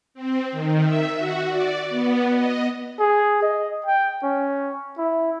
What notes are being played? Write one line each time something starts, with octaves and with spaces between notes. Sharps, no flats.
C4
D#3
E5
F#4
D5
B3
D#5
G#4
D#5
G5
C#4
E4